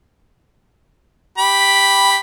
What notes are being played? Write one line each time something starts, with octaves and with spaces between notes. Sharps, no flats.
G4 B5